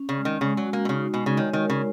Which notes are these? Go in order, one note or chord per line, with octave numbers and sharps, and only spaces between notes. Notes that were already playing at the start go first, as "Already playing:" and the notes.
Already playing: C#4
C#3
G#3
D#3
C#3 G#3
F#3
F#4
A#3
B2
C#3 D#4
B2 G#3
C#3
D#3 C#5
D#3
A#4
C#3